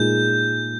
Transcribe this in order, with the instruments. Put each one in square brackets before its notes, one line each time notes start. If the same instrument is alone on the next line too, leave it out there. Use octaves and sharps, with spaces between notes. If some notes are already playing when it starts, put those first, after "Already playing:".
Already playing: [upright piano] A#2 G#3 D#4 G#4 [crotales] G6